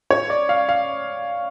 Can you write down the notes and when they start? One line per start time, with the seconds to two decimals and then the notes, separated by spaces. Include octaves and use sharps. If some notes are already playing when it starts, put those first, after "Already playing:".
0.11 C#5
0.30 D5
0.49 F5
0.69 F5